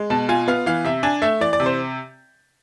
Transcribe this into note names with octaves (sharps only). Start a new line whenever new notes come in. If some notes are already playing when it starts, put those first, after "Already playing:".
Already playing: G#3
B2 A5
F4 G#5
B3 F5
E3 F5
C3 E5
D4 G#5
A3 E5
E3 D5
D5
C3
C5